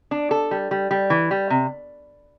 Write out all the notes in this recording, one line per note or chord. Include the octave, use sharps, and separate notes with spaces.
D4
A4
G3
G3
G3
E3
G3
C3